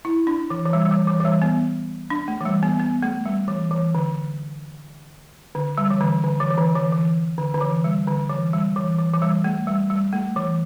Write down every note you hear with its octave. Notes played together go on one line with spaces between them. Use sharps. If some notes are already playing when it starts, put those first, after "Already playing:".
E4
D4
E3
E3
G3
G3
E3
E3
E3
G3
B3
D4
A3
E3
G3
B3
B3
A3
G3
E3
E3
D3
D3
G3
E3
D3
D3
E3
E3
D3
E3
E3
D3
D3
E3
G3
D3
E3
G3
E3
E3
E3
G3
A3
G3
G3
A3
E3